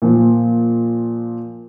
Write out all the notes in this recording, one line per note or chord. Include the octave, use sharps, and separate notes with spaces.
A#2 F3